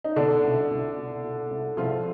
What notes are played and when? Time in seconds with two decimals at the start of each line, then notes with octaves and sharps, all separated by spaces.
0.04 D#4
0.16 B2 D3 D4
0.44 C2
0.71 C2
0.97 B2
1.24 B2
1.51 C2
1.77 C2 F3 F4